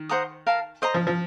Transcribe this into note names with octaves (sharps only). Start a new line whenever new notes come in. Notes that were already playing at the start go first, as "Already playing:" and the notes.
Already playing: D#3
C5 F#5 A#5 D#6
A#4 F5 A5
C5 D#5 A#5 D#6
F3
F3